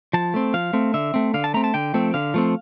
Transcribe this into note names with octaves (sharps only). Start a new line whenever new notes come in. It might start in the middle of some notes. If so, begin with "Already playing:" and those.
F3 A5
A3 C4
F3 F5
A3 C4
D3 E5
A3 C4
D3 F5
A5
A3 C4 A#5
A5
D3 G5
F3 A3 C4
D3 F5
F3 A3 C4